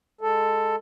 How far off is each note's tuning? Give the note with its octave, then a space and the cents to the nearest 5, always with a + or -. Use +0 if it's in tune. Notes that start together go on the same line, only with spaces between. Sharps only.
G#3 +0 A4 +5